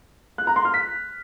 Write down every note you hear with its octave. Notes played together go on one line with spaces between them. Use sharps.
F#6
A#5
C6
F6
B6